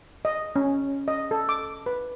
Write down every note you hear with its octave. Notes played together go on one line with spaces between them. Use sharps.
D#5
C#4
D#5
A4
D6
B4